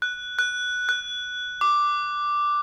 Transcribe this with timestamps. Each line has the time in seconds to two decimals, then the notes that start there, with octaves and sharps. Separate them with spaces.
0.02 F#6
0.39 F#6
0.89 F#6
1.61 D6